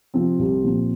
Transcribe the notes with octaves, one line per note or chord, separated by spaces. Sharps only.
C3 F3 C4
C2
A#2 F3